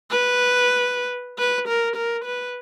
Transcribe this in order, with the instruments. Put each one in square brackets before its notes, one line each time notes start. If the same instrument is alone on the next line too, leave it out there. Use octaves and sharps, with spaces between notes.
[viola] B4
B4
A#4
A#4
B4